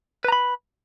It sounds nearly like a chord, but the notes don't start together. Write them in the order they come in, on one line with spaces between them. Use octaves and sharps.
B4 A#5 B5